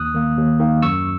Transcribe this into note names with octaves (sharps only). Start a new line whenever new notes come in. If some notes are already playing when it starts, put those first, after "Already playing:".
Already playing: D#2 D#6 F#6
D#3 A#3
D#2
D#3 A#3
F#2 C#6 E6